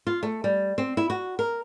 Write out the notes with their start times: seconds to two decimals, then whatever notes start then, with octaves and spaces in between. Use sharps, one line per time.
0.07 F4
0.23 A3
0.44 G3
0.78 C4
0.97 E4
1.10 F#4
1.39 A#4